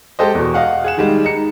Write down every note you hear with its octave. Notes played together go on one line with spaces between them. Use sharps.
G#3 G4 A4 C5 D#5
E2 B2
D#5 F5 F#5
G#4 F#5 E7
D#3 G3 G#3
D#4 C#7